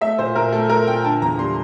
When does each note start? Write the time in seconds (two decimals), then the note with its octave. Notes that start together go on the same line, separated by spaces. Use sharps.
0.01 A3 E5
0.18 A#2 C5
0.35 A#2 A#4
0.52 A3 A4
0.70 A3 A#4
0.87 A#2 G5
1.05 D3 A5
1.22 E2 A#5
1.39 G3 C6